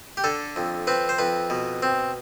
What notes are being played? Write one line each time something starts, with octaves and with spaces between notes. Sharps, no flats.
G4
D3 A4
F2
C4 B4
C5
F2 B4
B2
C4